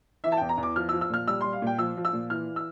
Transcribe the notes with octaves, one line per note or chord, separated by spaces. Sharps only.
E3 E5
A5
G5
E2
A#5
E2
D6
F3 F6
F3 E6
E6
A#2 F6
G3 E6
G3 C6
F5
A#2 G5
F3 E6
F3
E6
A#2
E3 F6
E6